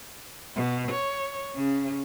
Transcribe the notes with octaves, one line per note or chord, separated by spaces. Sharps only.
B2
C#5
C#3